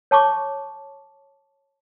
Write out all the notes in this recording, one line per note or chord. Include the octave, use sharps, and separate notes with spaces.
C#5 A5 C#6 D6